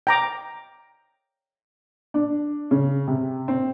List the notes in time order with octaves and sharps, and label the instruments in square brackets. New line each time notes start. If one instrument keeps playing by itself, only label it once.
[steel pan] G5 A#5 D6
[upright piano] D4
C#3
C3
C4